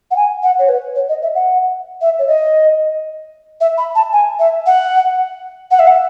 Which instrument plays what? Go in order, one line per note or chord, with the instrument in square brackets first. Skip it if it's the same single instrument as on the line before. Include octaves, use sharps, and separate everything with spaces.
[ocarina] F#5
G#5
F#5
C#5
B4
C#5
D#5
E5
F#5
E5
C#5
D#5
E5
B5
A5
G#5
E5
F#5
F#5
E5
F#5